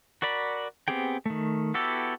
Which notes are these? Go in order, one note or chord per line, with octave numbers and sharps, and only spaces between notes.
F#4 A#4 D5 B5
B3 C4 G4 G#4 G5
D#3 A3
B3 E4 F#4 G4 A4